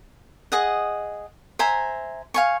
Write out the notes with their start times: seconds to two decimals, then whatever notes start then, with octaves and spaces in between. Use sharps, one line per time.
0.52 G#4 D#5 F#5
1.59 C5 E5 G#5 A#5
2.34 F5 G#5 C#6